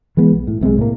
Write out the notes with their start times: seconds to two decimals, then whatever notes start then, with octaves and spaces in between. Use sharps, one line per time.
0.17 E3 G#3 B3
0.32 B1
0.47 A2
0.61 B1 C3 F#3 G#3
0.78 A2 A#3